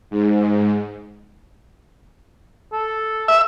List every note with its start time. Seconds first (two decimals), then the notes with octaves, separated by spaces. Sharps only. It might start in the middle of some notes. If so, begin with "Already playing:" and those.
0.10 G#2
2.72 A4
3.28 E5